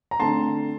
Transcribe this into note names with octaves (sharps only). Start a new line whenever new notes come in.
A#5
D3 A3 C4 A5 C6